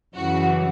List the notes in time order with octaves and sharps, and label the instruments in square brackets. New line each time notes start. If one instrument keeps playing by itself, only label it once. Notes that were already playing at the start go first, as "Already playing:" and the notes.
[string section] F#2 C#3 E3 G3 F#4